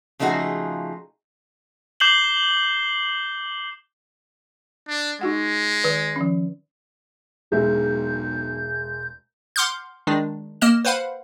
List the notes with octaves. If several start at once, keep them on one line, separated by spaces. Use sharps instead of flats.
C#3 F3 A3 D#4 F#4 G#4
D6 G6 C7 F#7 G7
D4
G#3 D#4 F#4 F#5
D#3 B4
D#3 F3 C#4
E1 B1 G#3 F#4 E5 G6
F#5 C6 D6 F6 G6
D#3 G#3 D4
A#3 D#5 F6 E7
B4 C5 F5 F#5 B5